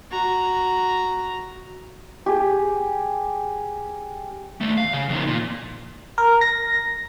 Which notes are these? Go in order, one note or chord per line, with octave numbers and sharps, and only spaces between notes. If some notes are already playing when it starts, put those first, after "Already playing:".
F#4 A#5
G4 G#4
D#2 A3
F5
C#3
F2 D#3
A#2
A#4
A#6